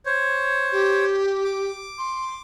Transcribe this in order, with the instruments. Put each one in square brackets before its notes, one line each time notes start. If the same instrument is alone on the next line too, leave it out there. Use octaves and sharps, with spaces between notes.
[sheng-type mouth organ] C5 C#5
[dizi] G4
[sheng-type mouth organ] D6
[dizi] C6